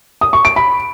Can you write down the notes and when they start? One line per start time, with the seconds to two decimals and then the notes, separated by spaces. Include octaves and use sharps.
0.21 D#6
0.33 C#6
0.45 D7
0.56 B5